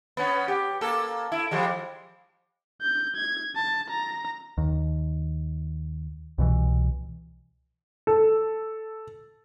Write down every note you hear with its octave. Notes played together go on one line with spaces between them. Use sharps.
B3 C#4
G4
A#3 A4
E4
F3 G3 G#3
G6
G#6
A5
A#5
D#2
C2 B2 E3
A4